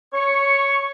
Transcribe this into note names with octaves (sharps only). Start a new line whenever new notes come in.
C#5 C#6